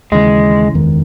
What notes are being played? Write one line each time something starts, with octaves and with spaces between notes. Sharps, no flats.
D#2 C#3 E3 G#3
F#1 E2 D#3 G#3